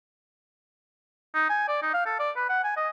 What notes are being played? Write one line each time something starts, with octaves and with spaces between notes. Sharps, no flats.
D#4
G#5
D5
D#4
F5
A4
D5
B4
F#5
G#5
D#5